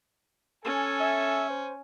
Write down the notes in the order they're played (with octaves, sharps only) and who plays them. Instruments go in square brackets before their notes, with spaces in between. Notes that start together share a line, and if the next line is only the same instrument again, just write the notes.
[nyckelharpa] C#4 [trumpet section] A4 G#5
[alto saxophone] E5
C5